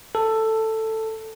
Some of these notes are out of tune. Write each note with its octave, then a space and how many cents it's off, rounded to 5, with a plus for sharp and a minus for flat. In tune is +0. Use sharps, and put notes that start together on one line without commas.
A4 +10